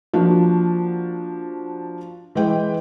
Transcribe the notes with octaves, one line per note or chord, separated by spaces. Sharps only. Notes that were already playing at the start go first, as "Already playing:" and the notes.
F3 A#3 D4 F#4
E3 G#3 B4 G5